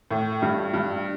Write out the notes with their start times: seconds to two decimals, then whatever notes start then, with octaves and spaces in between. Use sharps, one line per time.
0.11 A2
0.42 G2
0.74 G2